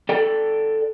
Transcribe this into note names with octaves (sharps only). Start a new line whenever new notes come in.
A4 D5 G5